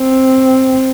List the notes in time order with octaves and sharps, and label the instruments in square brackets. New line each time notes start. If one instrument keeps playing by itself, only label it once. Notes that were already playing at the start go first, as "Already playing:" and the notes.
Already playing: [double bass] C4